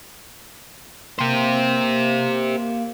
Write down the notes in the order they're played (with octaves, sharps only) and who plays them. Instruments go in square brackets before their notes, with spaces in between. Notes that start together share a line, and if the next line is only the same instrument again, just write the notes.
[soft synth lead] A#3 [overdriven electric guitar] G4 C5